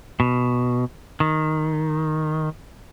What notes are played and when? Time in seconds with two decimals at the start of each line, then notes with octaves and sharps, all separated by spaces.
0.20 B2
1.20 D#3